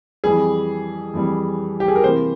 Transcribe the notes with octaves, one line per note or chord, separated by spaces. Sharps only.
F2 E3 G3 G#4
F2 E3 G3
G4
G#4
A#4
C3 E3 A#3 C5